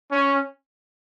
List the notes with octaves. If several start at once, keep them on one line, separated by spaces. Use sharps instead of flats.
C#4